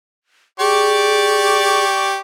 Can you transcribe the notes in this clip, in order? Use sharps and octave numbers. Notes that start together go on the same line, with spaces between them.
G4 G#4 D5 C#6